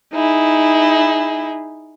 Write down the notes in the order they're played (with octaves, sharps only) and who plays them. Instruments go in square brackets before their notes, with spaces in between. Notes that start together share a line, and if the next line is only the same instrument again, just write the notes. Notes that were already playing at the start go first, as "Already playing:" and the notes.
[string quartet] D#4 E4 G#4